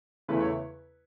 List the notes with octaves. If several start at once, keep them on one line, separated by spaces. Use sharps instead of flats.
E2 C#3 E3 A3 E4 B4
C#5